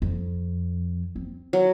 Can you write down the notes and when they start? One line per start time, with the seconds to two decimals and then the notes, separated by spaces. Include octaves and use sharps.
0.02 F2
1.16 C4
1.53 F#3